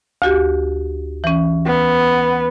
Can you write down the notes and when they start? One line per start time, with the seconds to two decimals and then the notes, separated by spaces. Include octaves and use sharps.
0.22 D2 F#4 G4
1.24 E3 C#4
1.67 B3